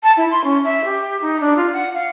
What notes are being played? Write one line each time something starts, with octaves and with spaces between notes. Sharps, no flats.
A5
E4
C6
C#4
E5
G4
D#4
D4
F4
F#5
F5